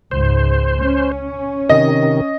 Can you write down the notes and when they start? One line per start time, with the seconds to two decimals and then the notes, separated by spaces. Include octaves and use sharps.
0.11 C#2 G#2 C5
0.83 C#4
1.69 C3 D#3 D#5